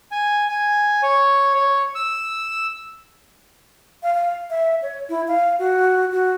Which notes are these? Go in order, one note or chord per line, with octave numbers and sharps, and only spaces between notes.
G#5
G#5
C#5
C#5
E6
F5
F5
E5
C#5
E4
F5
F#4
F#4